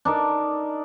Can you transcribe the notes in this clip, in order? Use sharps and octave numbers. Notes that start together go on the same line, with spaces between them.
D4 D#4 A#4